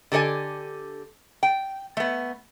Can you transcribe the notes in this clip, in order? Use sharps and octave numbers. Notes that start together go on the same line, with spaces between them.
D3 G4 A4 D5 G#5
G5
A3 B3